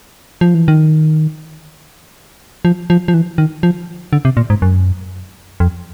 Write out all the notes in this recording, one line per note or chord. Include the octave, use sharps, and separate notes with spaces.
F3
E3
D#3
F3
F3
F3
E3
D#3
F3
D3
C3
A#2
G#2
F#2
F2